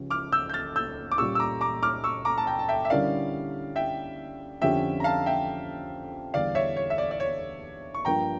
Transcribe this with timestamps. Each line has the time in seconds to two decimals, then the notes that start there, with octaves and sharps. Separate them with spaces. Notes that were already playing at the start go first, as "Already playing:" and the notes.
Already playing: C#2 C#3 F3 C#4 G4
0.10 D6 F6
0.32 E6 G6
0.49 G6
0.54 F6 A6
0.76 E6 G6
1.12 D6
1.18 A#2 G3 C#4 G4 C#6 E6
1.35 E6
1.40 A#5 D6
1.61 A#5 D6
1.83 D6 F6
2.04 C#6 E6
2.25 A#5 D6
2.38 A5
2.47 G5 A#5
2.59 A5
2.69 E5 G5
2.85 E5
2.90 D3 G3 C#4 E4 A#4 D5 F5
3.76 E5 G5
4.61 F2 D3 F3 C#4 G4 E5 G5
5.00 A#5
5.04 F5 A5
5.26 E5 G5
6.34 E2 D3 G3 D4 D5 F5
6.55 C#5 E5
6.77 C#5
6.90 E5
6.98 D5
7.11 D5
7.20 C#5
7.94 C#6
8.05 G2 F3 A#3 G5 A#5